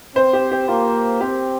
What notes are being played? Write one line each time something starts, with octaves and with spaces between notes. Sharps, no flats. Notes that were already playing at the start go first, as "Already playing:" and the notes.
C4 C5
G4
G4
A#3 F4
C4 G4